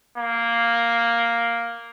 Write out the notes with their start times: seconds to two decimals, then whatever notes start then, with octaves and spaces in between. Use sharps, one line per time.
0.18 A#3